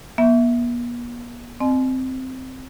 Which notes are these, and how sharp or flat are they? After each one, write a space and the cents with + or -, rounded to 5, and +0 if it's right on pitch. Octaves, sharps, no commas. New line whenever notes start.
B3 -45 E5 +0
C4 -10 D#5 -45 G#5 +40